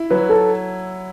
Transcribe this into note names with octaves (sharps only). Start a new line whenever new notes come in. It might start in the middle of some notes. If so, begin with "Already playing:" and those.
Already playing: E4
F#3 B4
A4